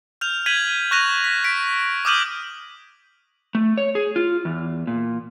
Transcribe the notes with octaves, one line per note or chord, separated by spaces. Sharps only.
F6 G6 F7
G6 G#6 B6 D#7 F#7
C#6 F#6 A#6 D#7 F7
B6
B6 D7
D6 D#6 F6 G6 D#7 F#7
A3
C#5
G#4
F4
E2
A#2